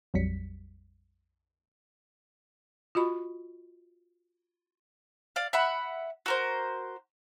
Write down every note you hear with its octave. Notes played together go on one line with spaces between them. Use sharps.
A#1 F2 F#3 G3 B6 C#7
F4 F#4 D#5 B5 C#6
D5 F5
E5 F#5 B5
F#4 A#4 C5